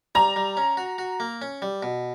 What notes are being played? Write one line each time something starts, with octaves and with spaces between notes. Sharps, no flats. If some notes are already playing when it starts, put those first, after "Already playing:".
G3 A#5
G3
C#4
F#4
F#4
A#3
C#4
G3
B2